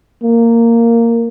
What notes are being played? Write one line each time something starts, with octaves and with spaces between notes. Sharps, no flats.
A#3